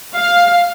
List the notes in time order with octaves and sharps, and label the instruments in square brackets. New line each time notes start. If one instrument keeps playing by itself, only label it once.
[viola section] F5